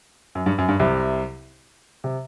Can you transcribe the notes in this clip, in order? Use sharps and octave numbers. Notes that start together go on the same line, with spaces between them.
F#2
G2
F#2
G2
C2 C3
C3